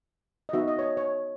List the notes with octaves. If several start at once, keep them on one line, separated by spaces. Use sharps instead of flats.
D#5
B3 D#4 F#4 E5
D#5
C#5
D#5
C#5